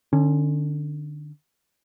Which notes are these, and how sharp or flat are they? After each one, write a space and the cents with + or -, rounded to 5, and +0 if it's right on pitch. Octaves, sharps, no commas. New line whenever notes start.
D3 +30 C#4 +0